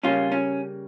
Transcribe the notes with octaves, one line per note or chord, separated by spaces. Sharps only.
C#3 G3 A#3 C#4 F4
C#4